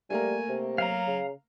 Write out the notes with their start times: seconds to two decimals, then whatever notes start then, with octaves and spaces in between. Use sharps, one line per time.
0.10 G3 A3 A#3 A#4 G#5
0.49 C3
0.78 F#3 F5 A#5
1.07 C#3